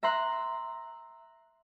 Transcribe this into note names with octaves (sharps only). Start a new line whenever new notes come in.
E5 A#5 C6 F#6